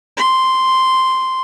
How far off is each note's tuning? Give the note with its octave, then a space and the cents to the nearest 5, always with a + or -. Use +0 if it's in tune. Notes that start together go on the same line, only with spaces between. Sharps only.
C6 -5